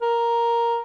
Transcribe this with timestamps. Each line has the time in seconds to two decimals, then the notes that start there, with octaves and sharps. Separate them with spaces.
0.02 A#4